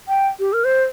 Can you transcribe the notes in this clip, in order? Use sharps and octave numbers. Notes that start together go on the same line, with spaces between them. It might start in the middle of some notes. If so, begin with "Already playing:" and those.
G5
G4
A#4
C5